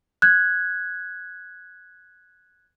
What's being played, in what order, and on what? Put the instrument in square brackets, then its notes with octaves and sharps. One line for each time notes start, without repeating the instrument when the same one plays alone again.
[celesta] F#6 G#6